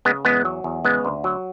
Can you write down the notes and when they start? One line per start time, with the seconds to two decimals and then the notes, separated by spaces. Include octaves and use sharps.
0.05 C#3 G#3 B3
0.25 E2 G#3 B3
0.45 F#3
0.64 E2
0.84 C#3 G#3 B3
1.05 D2
1.24 F#3